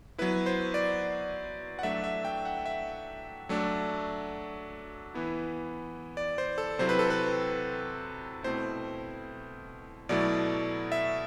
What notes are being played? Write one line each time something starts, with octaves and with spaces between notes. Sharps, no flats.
F#3 B3 E4 B4
C5
D5
F#5
F#3 A3 D4 E5
E5
G5
F#5
E5
F#3 A3 D4
E3 B3 E4
D5
C5
A4
C3 F#3 C4 E4 C5
B4
A4
B4
B2 A3 C4 E4 C5
B2 F#3 A3 E4 D5
E5